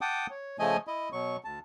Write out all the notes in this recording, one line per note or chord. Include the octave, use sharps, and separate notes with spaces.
F#5 G5 A5 D6 D#6
C#5
C#3 F3 A3 D#5 G#5
E4 D#5
B2 F#3 C#6
D2 A5